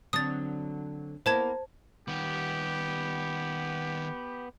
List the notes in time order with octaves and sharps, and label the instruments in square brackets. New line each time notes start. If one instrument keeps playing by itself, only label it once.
[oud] D3 F#3 C4 [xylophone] D#6 A6
[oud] A#3 B3 E4 [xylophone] C5 A5 G#6
[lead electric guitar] D#3 G3 [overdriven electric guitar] B3 [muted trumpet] G4